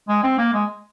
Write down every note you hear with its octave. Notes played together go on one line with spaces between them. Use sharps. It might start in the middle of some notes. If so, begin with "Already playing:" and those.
G#3
C4
A#3
G#3